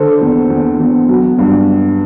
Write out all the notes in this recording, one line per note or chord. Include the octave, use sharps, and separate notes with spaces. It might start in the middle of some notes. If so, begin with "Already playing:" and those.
Already playing: D3 A4 C5
E2
E2
E2
F#3
G2